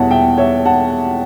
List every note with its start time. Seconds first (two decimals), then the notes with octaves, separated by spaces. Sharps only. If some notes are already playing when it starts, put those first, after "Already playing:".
Already playing: E2 B2 G3 C#5 E5 F#5 A5
0.11 E5 G5
0.38 C#5 E5
0.65 F#5 A5